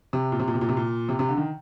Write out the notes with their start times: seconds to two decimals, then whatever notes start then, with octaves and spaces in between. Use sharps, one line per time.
0.13 C3
0.32 A#2
0.39 C3
0.48 A#2
0.54 C3
0.61 A#2
0.69 C3
0.77 A#2
1.09 C3
1.19 C3
1.29 D3
1.37 D#3